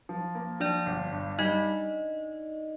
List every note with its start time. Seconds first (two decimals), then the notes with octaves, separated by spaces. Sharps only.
0.09 F3
0.35 A#3
0.60 F3 D4 D5
0.86 G1
1.12 G2
1.39 G3 D#4 D#5